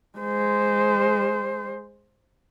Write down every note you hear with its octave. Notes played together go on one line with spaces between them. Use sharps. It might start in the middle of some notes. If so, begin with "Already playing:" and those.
G#3 C5